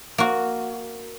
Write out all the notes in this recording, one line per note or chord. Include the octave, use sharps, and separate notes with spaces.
A#3 F#4